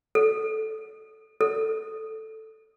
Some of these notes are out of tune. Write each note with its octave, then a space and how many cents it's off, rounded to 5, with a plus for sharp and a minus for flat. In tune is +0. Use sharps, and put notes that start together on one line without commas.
A4 -10
A4 +0